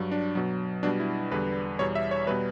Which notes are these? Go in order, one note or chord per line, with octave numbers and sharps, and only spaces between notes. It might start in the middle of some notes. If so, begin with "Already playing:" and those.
Already playing: G2 F#3
D4
B2 F#3
B2 G3 D4
E4
E2 D3 G3 B4
E2 B2 G3 C#5
E5
C#5
B2 G3 B4